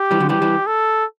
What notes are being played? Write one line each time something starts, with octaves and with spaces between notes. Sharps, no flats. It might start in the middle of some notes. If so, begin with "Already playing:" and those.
Already playing: G4
E3 G3
D3 F#3
E3 G3 G4
E3 G3
A4